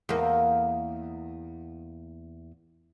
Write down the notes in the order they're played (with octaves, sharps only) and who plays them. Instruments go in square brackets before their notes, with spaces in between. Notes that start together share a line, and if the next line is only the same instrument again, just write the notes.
[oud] E2 A#3